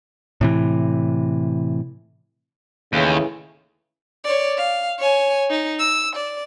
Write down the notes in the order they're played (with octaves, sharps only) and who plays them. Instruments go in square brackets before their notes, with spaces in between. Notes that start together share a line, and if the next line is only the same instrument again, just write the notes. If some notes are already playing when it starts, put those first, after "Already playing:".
[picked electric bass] A2 C3 E3
[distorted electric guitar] D#2 [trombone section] A2 C#3 E3
[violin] C#5 D5
F5
C#5 G#5
D#4
E6
D5